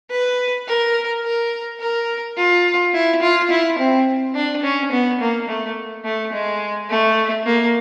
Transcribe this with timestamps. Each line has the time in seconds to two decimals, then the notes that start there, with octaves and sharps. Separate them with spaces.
0.10 B4
0.68 A#4
1.24 A#4
1.80 A#4
2.37 F4
2.94 E4
3.22 F4
3.50 E4
3.79 C4
4.35 D4
4.63 C#4
4.92 B3
5.20 A#3
5.48 A3
6.05 A3
6.33 G#3
6.90 A3
7.46 A#3